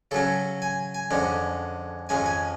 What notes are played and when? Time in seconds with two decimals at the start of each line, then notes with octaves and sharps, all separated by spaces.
0.11 C#3 F#3 C#4 A4
0.62 G#5
0.94 G#5
1.11 F2 D3 G#3 C#4
2.09 F2 F3 G#3 C#4 G#5
2.26 G#5